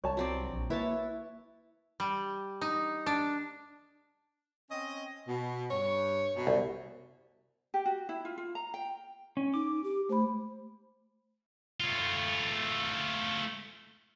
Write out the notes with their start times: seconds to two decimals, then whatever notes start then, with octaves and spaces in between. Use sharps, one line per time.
0.04 C2 C#5 A5
0.17 F#3 C4 D5
0.49 A#1
0.70 A#3 E4 B4 C#5 A5
2.00 G3
2.61 D#4
3.06 D4
4.70 C4 C#4 D#5
5.26 B2
5.70 G2 C#5
6.34 F#2 B2
6.47 C2
7.74 G4
7.86 F#4
8.09 E4
8.25 F4
8.38 F4
8.55 A#5
8.74 G5
9.37 C#4
9.54 D#4 D6
9.84 G4
10.09 A3 C5 B5
11.80 A3 F4